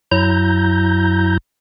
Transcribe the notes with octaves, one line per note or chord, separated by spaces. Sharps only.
F#2 F#3 E4 A#5 G6